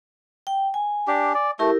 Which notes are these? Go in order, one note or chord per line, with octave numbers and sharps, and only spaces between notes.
G5
G#5
D4 G4
D5
A3 E4 G4 A#4